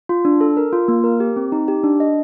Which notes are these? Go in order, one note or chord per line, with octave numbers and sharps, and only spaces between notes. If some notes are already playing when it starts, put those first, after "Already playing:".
F4
D4
A4
A#4
F4
A#3
A#4
G4
C4
D#4
G4
D4
D#5